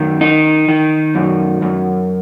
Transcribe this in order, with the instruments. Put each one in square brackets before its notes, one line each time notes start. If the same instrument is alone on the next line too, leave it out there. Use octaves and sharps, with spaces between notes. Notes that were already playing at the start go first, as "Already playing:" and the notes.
Already playing: [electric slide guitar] F#2 D#3
D#4
D#3
F#2
F#2